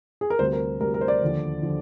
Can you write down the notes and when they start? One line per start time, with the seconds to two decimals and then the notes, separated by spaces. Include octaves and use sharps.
0.21 G#4
0.30 A#4
0.39 D2 C3 G3 C5
0.53 A#4
0.80 D2 C3 G3 A#4
0.94 A#4
1.01 C5
1.08 D5
1.21 D#2 D3 F3
1.62 D3 F3